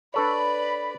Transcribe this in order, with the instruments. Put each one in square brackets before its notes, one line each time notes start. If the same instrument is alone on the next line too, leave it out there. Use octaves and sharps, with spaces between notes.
[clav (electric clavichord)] D4 A4 C#5 [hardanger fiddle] B4 D5 [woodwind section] B5